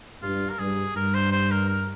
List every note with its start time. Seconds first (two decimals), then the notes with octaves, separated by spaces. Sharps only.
0.22 G2 F4
0.49 A#4
0.59 G2 G#4
0.96 G2 A#4
1.14 C5
1.32 C5
1.51 A#4
1.69 A#4